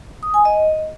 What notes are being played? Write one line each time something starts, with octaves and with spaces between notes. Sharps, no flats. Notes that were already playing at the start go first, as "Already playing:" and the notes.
D#6
G#5
D#5